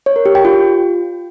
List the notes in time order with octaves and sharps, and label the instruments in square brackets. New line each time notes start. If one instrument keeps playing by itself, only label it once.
[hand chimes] C#5
A#4
G4
G5
F4